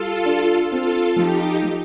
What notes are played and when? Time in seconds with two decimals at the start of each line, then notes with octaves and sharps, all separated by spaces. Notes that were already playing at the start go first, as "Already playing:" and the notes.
Already playing: G3 F4 A4
0.25 D4
0.71 C4 F4 A4
1.16 F3 D#4 G4
1.63 F3